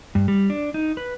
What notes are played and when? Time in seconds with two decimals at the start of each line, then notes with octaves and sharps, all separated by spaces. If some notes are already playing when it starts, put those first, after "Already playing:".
0.15 G2
0.28 G3
0.50 D4
0.74 D#4
0.97 B4